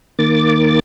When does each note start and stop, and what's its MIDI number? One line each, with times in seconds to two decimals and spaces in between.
0.19 0.79 51
0.19 0.79 58
0.19 0.79 86
0.19 0.79 93